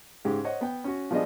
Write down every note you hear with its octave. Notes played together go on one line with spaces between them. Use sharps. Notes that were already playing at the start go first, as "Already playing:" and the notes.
G#2 C#3 G#3 G4
C5 C#5 D#5 F#5
B3 G5
C#4 F#4
F3 G3 B3 D4 G#4 D#5